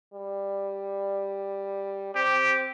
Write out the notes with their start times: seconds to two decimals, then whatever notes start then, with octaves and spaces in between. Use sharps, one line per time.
0.14 G3
2.15 C4 G4